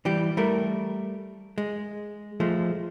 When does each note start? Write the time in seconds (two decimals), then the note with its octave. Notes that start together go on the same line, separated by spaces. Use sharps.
0.05 E3 G3 G4
0.37 G3 A3 A#4
1.58 G#3
2.40 F3 G#3 A3